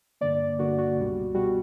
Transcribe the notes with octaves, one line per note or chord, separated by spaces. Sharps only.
G2 D3 A#3 D5
G2 D3 A#3 F#4
F#4
C#2 B2 G3
B2 G3 F#4